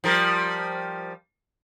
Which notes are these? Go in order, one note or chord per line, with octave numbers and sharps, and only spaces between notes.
F3 G3 A#4